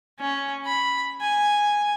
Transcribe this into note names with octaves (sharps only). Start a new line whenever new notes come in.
C#4
B5
G#5